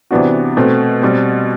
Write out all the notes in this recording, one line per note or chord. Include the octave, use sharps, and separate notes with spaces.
C3 E3 B3 D4 F#4
B2 A3 C4
B2 G3 C4